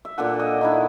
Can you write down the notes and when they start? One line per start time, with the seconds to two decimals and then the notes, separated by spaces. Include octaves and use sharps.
0.05 E5
0.18 A#2 D4 A4 F#5
0.40 D#5
0.61 D#3 D4 E4